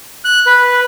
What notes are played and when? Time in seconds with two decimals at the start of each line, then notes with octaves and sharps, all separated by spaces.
0.25 F#6
0.46 B4